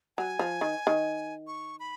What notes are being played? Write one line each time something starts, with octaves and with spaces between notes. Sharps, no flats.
F#3 G#5
F3
D#3
D#3
C#6
B5